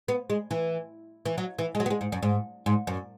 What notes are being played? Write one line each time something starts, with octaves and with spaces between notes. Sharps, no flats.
B3
G#3
E3
E3
F#3
E3
G#3
F#3
B3
G#3
G#2
F#2
G#2
G#2
F#2